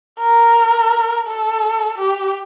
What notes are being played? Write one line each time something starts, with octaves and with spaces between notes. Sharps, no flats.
A#4
A4
G4